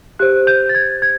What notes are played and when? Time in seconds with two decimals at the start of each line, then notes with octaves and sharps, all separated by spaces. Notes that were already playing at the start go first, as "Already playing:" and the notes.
0.19 G4 C5 F#6
0.47 G6
0.69 A6
0.75 G#6
1.02 G#6